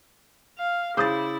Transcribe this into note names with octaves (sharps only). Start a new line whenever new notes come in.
F5
C#3 E4 C5 D6 D#6 A6